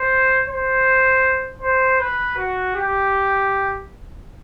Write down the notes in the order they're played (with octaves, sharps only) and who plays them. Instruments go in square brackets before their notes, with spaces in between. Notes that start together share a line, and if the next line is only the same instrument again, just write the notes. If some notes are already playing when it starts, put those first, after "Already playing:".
Already playing: [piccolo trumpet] C5
C5
C5
B4
F#4
G4